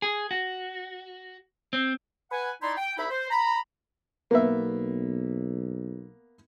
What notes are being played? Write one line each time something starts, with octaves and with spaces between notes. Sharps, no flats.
G#4
F#4
C4
B4 F#5 G#5
D#4 E4 D5 C6
G5
C2 D#4 E4 E5 B5
C5
A#5 B5
B1 A#3 B3 E5